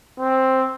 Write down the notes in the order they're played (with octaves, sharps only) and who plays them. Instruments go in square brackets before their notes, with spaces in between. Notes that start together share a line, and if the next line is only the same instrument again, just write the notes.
[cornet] C4